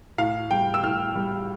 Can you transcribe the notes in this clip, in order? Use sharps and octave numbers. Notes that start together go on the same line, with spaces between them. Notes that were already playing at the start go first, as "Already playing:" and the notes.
A2 F5
G3 G5
E6
A2 F6
G3